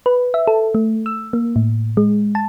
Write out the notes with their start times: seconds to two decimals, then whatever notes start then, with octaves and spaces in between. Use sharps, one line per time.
0.06 B4
0.34 E5
0.47 A4
0.75 A3
1.06 E6
1.33 A#3
1.56 A2
1.97 G#3
2.35 A5